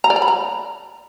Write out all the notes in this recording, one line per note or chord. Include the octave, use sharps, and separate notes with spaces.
A#5
D5
A#5
B5
A#5